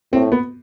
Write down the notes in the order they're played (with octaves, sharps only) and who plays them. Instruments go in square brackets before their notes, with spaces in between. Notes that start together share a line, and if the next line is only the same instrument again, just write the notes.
[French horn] A2 [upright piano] C4
[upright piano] B3